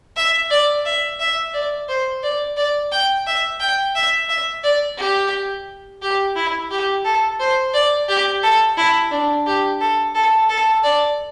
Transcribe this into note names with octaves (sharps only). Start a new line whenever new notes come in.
E5
D5
E5
E5
D5
C5
D5
D5
G5
E5
G5
E5
E5
D5
G4
G4
E4
G4
A4
C5
D5
G4
A4
E4
D4
G4
A4
A4
A4
D5